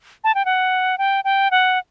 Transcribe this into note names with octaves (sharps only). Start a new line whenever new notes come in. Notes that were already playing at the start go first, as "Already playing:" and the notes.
A5
G5
F#5
G5
G5
F#5